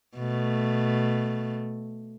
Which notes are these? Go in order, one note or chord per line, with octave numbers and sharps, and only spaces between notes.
B2 A3